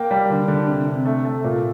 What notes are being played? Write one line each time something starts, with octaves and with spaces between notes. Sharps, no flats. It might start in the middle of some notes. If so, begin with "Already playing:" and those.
Already playing: A#3 G5
G3
D3
D3
C3
C3
A3
A3
A#2